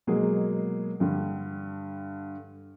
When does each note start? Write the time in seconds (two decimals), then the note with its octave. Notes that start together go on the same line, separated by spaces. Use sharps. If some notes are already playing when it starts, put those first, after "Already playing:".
0.07 B2 F#3 G#3 A#3 G#4
1.00 G2 D3 G3